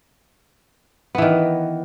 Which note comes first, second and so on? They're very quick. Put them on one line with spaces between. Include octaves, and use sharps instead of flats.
B3 E3 D#3